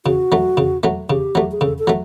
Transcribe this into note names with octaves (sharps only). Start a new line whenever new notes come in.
C#3 F#4
F#3 A3
C#3
F#3 A3
C#3 G4
F#3 A3
G#4
C#3 A4
A4
F#3 A3